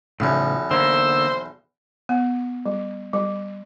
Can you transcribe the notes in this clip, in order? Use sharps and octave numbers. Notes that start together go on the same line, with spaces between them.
B1 E2 A2 C#3 F3
D3 A#3 B3 C5 E6
B3
G3
G3